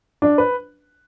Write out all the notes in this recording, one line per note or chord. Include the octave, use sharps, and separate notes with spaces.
D4
B4